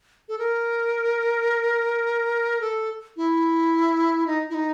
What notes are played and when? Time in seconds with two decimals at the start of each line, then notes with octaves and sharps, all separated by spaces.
0.29 A4
0.39 A#4
2.61 A4
3.17 E4
4.27 D#4
4.50 E4
4.54 D#4